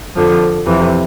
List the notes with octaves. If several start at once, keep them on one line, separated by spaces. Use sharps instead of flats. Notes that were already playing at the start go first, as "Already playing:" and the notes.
F2 D3 F3
F2 C3 E3